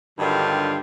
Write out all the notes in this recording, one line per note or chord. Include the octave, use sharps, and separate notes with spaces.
G2 D3 D#3 F#3 F4 G4